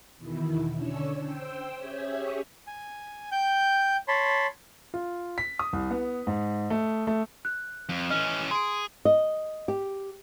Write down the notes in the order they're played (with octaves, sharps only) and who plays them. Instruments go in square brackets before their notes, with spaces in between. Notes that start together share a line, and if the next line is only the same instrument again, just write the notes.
[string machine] E2 B2 D#3 E4
D3 C#4 D4 C#5 E6
C5 G5 E6
C#4 G4 G#4 C#5 E5
[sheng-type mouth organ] G#5
G5 G6
C#5 A5 B5 C6
[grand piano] F4
B6
D#6
C2
B3
G#2
A3
A3
[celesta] F#6
[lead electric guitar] F2
[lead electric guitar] E3 C#4 [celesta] D#5 F6
[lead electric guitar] G#4 [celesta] C6 D7
[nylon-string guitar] D#5
G4